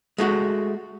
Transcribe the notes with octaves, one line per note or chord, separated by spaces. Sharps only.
G#3 A3 F#4